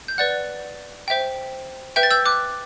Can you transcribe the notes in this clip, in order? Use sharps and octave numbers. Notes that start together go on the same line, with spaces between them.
G6
B4 D5 F#5 F#6 A6
C5 E5 G5
B4 E5 G5 G6
A6
E6 G6
D6 F#6